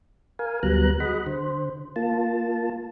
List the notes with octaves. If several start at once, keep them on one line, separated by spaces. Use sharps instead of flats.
A#4 F5 G#5
D2 F#3 G3 B3 A#5 F#6
F#4 G#4 D#5 F#5 B5
D3 C5
A#3 F4 A5